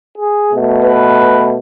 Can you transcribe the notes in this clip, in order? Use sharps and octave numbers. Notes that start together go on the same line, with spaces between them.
G#4
B2 A3
B4